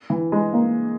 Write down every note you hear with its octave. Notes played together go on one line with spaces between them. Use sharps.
E3
G#3
A#3